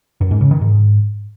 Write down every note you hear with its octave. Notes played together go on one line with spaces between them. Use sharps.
F#2
G#2
C#3
D#3
G#2